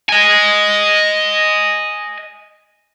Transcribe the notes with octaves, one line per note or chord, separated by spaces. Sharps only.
D#5 G#5